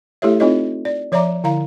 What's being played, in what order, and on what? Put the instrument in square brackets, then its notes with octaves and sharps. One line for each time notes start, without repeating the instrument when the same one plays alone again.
[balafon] A3 E4 G4 A4 C#5 E5
C4 D#4 F4 A4 C#5 D#5
D5
F3 C#5 D5 E5 A#5 D6
D3 E4 F5 A#5